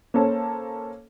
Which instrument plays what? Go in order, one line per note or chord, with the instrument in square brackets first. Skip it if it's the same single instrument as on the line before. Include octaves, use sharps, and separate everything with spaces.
[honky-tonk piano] A#3 C#4 A4 C5